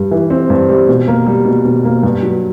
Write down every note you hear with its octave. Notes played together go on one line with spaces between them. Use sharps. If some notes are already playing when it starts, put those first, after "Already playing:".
Already playing: G2 G3
E3
C4
G2
G3
B2
A#3
G3
B2
B2
A#3
G2
F#3